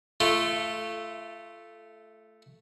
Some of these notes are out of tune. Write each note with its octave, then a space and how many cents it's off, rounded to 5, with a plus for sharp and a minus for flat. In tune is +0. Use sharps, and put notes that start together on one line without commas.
A3 -5 F4 -30